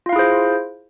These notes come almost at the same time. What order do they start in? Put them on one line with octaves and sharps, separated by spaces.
F4 F5 E4 G#4 C5